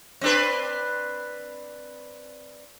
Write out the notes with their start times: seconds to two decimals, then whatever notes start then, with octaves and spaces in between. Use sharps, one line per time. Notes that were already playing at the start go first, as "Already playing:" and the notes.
0.21 C4 D4 B4